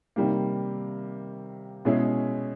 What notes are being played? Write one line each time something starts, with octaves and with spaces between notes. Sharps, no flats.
C3 D#3 G3 A#3
B2 G#3 C#4 E4 G#4